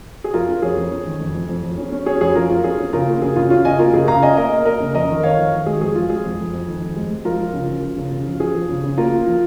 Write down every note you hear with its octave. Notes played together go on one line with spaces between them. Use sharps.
G#4
F2 F4 A#4
C#4
F2 G#4 C#5
F2
C#4
D#3
F2
F2
F2
F2
C#4
C#4
C#4 G#4 C#5
F2 G#4 C#5
F2 F4 A#4
F2 F4
C#4 G#4
C#4
C#3 F4 A#4
A#3
C#3 G#4
C#3 F4
C#4 F4
C#3 D#5 G#5
A#3 F4 A#4
C#3 G#4
C#3 F5 A#5
C#4 D#5 G#5
A#3 A#4 D#5
A#3
A#3 A#4 D#5
C#3
F2 A#4 D#5
D#3
D#3 C#5 F5
F2
D#3
G#3 G#4
F2 G#4
F2 F4
G#3 G#4
F2
F2
F2
D#3
F2
G#3
G#3
F3 F4 A#4
F3
C#3
F3
F3
C#3
C#3
F3
F3 G#4
F3
C#3
C#3
A#3 F4 A#4
A#3
F3